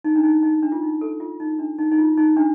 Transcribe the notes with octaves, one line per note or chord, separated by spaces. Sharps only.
D#4
D4
D#4
D#4
D4
F4
D#4
A4
F4
D#4
D4
D#4
D#4
F4
D#4
D4